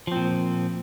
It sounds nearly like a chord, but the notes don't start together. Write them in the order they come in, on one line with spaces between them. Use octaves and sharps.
F3 C4 A#2